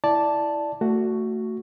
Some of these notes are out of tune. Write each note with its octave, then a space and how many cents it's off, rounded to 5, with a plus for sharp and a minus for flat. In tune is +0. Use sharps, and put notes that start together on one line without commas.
E4 +0 D5 +0 A5 +0
A3 +20 F#4 +0